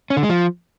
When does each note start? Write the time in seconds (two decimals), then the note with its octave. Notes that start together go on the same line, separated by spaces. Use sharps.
0.10 C#4
0.17 D3
0.23 G#3
0.30 F3